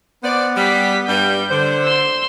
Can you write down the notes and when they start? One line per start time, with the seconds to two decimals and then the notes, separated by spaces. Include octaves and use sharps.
0.23 B3 C5 D5
0.56 G3 G4 B6
1.08 G2 G3 G6
1.50 D3 C5
1.83 C6 E6